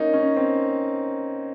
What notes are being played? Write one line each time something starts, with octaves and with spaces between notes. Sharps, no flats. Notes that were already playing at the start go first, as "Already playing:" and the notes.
Already playing: A#3 C#4 D#4
C#4
C4